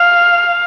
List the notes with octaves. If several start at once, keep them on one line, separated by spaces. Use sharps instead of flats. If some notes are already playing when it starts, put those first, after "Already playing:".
Already playing: F5